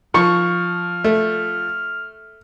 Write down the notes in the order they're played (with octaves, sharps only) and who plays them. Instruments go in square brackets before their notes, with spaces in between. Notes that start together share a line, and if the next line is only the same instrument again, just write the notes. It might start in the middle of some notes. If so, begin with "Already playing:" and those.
[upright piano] F3 [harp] C#6 [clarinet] F6
[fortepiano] A3